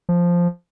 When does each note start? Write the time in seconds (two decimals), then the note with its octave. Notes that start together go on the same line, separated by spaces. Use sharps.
0.09 F3